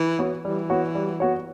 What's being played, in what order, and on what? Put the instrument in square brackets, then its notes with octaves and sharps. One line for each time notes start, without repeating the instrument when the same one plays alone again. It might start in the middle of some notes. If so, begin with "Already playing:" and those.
Already playing: [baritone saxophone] E3
[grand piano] B3 F#4 C#5
[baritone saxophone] E3 [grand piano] G3
[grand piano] B3 F#4 C#5
G3
B3 F#4 C#5